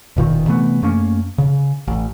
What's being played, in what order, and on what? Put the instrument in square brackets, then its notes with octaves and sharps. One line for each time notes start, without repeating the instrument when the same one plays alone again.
[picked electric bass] E1 A#2 D#3
C3 E3 A3 B3
F#2 A3 A#3 C#4
C#3
A1